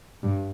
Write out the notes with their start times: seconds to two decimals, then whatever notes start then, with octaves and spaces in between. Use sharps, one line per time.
0.23 G2